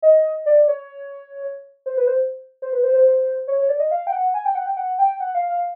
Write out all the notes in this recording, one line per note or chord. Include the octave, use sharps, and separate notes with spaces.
D#5
D5
C#5
C5
B4
C5
C5
B4
C5
C5
C5
C#5
C#5
D5
D#5
F5
G5
F#5
G#5
G5
F#5
G5
F#5
G5
F#5
F5
F5